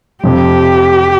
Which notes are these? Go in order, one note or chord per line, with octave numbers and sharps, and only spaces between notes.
F2 C3 F3 G4